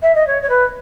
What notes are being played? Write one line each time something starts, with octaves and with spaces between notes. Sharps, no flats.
E5
D#5
C#5
C#5
B4